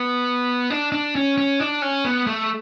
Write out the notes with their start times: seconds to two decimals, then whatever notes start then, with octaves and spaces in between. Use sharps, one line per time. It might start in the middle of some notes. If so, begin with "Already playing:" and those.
Already playing: B3
0.70 D4
0.92 D4
1.15 C#4
1.38 C#4
1.60 D4
1.82 C#4
2.05 B3
2.27 A3